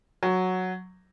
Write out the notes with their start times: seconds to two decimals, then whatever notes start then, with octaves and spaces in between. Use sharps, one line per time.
0.23 F#3